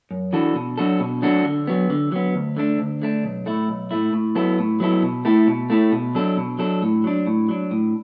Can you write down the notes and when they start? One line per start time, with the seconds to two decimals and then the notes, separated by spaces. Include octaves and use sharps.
0.11 F#2
0.33 E3 D4 F#4 A4
0.55 B2
0.78 F#3 D4 F#4 A4
1.00 B2
1.22 F#3 D4 F#4 A4
1.45 D3
1.67 F#3 B3
1.90 D3
2.12 F#3 B3
2.34 D2
2.57 D3 A3 D4
2.79 D2
3.02 D3 A3 D4
3.24 B1
3.46 A2 A3 E4
3.68 B1
3.91 A2 A3 E4
4.13 A2
4.35 F#3 B3 E4 A4
4.58 A2
4.80 F#3 B3 E4 A4
5.02 B2
5.25 A3 E4 A4
5.47 B2
5.70 A3 E4 A4
5.92 B2
6.15 F#3 D4 A4
6.37 B2
6.59 F#3 D4 A4
6.82 A2
7.04 F#3 D4
7.27 A2
7.49 F#3 D4
7.71 A2